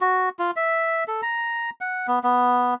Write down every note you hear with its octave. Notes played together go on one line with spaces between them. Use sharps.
F#4
F4
E5
A4
A#5
F#5
B3
B3